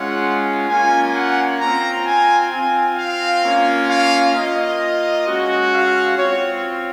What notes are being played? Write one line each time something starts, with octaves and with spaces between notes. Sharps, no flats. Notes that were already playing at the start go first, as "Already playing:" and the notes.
Already playing: G#3 C#4 F4 F#5
A#3 C#4 F4 G#5
F#5
C4 F4 A#5
G#5
C4 F4 G#5
F5
A#3 C#4 F4
F5
A#3 F4 D#5
G#3 C#4 F#4
F5
C4 F4 C#5